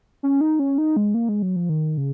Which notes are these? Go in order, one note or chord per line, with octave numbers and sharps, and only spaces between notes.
C#4
D#4
C#4
D#4
G#3
A#3
G#3
F#3
F3
D#3
C#3